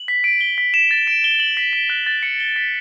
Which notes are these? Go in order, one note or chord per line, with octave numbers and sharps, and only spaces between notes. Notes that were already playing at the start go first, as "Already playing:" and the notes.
Already playing: F#7
B6
D7
G7
B6
E7
A6
D7
G7
F#7
B6
D7
F#6
A6
C#7
G7
B6